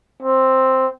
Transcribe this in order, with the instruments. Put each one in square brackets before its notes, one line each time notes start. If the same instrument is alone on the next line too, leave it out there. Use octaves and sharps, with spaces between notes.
[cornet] C4